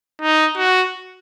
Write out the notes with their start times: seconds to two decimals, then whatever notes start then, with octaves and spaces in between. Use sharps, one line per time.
0.22 D#4
0.57 F#4